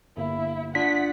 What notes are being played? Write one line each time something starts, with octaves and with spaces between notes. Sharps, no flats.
G1 A#3 E4
D4 F4 D5 F#5 B6